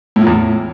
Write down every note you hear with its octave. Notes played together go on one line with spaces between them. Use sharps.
A2
A#2
E2
A2